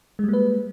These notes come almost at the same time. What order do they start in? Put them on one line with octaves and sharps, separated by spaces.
G#3 G3 A#3 B4